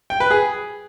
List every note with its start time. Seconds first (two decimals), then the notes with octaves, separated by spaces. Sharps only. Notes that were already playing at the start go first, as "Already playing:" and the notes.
0.10 G5
0.20 B4
0.31 G#4